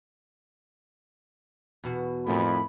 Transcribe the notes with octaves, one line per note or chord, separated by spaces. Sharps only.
E2 B2 F#4
F2 A2 D#3 B5